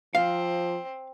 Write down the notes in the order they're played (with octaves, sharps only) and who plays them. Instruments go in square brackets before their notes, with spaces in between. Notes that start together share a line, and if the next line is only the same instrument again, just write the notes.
[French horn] F3 [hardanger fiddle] C4 [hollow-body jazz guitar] F5